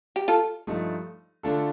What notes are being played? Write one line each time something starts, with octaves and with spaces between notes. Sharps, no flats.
G4
F4 A4
G2 F3 A3 D#4 A4
D3 A3 D4 F4 A4